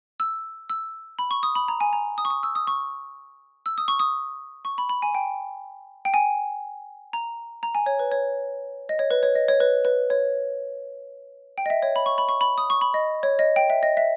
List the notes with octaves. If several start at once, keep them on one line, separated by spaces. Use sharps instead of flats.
E6
E6
B5
C#6
D#6
B5
A#5
G#5
A#5
D#6
C#6
D#6
E6
D#6
C#6
E6
D#6
C#6
D#6
C#6
B5
B5
G#5
G5
G5
G#5
A#5
A#5
G#5
C#5
B4
C#5
D#5
C#5
B4
C#5
D#5
C#5
B4
B4
C#5
G5
D#5
E5
C#5
B5
C#6
B5
C#6
B5
D#6
C#6
B5
D#5
C#5
D#5
G5
E5
D#5
E5